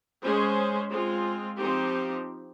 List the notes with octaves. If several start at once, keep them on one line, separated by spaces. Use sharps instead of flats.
G#3 C#4 G#4 C5
G#3 C4 F4
F3 C4 D#4 G4